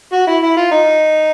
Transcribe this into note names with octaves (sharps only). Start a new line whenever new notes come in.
F#4
E4
E4
F4
D#4